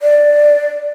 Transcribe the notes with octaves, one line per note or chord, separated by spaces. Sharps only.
D5